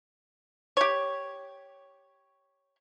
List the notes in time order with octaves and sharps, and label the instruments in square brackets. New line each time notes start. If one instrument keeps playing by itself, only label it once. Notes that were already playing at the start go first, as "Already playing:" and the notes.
[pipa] G4 C#5